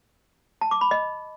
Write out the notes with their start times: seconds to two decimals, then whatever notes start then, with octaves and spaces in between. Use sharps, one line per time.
0.61 A5
0.71 D6
0.81 B5
0.91 D#5